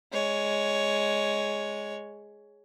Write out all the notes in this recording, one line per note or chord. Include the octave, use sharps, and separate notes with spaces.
G#3 C#5